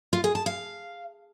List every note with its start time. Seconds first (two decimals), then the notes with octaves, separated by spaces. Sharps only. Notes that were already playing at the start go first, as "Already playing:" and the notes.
0.13 F4
0.24 G#4
0.35 A5
0.46 F5